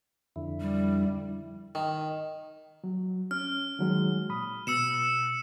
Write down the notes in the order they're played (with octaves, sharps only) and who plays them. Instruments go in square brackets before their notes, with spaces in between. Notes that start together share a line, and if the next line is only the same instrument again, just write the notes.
[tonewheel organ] F2 D3 E4
[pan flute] G3
[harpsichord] D#3
[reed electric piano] F#3
[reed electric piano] C#4 [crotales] F6
[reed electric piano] D#3 F#3 G#3
A#2 B5 D#6
[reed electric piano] B2 [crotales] E6 C#7 E7